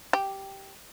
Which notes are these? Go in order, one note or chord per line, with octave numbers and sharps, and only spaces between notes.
G4